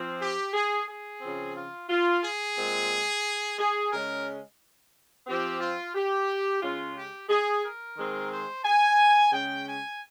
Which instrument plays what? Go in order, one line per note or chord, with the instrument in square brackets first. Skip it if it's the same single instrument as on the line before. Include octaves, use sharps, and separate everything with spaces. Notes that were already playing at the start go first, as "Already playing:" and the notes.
Already playing: [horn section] F3 C4
G4
G#4
G#4
C#3 F3 C4
F4
F4
G#4
A#2 G#3 C4
G#4
C#3 G#3 C#4 A#4
F3 C4 G4
F4
G4
C#3 G#3 C#4 F4
G4
G#4
A#4
D#3 G#3 C4
C5
G#5
C#3 G#3 C#4 G5
G#5